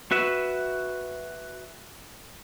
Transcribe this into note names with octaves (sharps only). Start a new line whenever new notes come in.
F#4 B4 E5